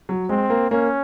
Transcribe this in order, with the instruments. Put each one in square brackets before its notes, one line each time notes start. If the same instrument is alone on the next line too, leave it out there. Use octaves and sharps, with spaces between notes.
[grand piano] F#3
[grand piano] G#3 [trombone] C4
[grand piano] A#3
[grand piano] A#3 [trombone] C#4